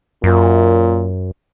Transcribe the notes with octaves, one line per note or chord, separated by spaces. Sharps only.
F#2 A#2